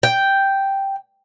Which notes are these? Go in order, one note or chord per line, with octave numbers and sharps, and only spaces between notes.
G5